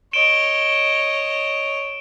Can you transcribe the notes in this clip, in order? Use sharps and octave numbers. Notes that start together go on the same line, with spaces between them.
C#5 D#5 D7 E7 G7